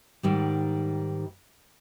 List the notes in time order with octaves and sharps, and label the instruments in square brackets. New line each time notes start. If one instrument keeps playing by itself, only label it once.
[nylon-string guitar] G#2 D#3 G3